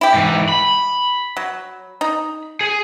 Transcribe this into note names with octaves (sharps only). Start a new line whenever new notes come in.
E4 G4
G#2 E3
B5
F#3
D#4
G#4